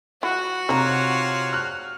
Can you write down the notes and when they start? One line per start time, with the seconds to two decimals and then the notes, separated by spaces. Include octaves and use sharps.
0.23 F3 E4 F#4 F#5
0.69 C3 D#4 F4 C#5 D#5 A#5
1.53 F6 F#6